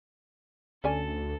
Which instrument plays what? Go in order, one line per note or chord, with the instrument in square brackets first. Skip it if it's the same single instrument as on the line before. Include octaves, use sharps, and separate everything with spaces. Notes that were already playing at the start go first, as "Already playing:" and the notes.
[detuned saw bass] D2 [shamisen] C#4 D5 G#5 [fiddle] A4